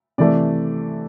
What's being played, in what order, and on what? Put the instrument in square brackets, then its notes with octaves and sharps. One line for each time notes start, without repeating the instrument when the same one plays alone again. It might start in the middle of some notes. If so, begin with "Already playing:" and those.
[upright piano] C3 E3 A3 D5